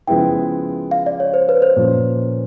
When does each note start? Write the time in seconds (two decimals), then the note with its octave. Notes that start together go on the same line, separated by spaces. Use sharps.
0.07 C#3 F3 G#3 B3 E4 G5
0.91 F5
1.06 D5
1.20 C#5
1.34 C5
1.49 B4
1.62 C5
1.76 A#2 F3 A#3 C#4